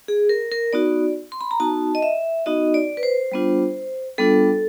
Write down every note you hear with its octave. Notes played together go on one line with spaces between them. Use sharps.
G#4
A#4
A#4
B3 D#4 F#4 D5
C6
B5
A#5
B3 D#4 F#4 A5
D#5
E5
B3 D#4 F#4 D#5
D5
B4
C5
G3 B3 D4 F4
G3 B3 D4 F4 A4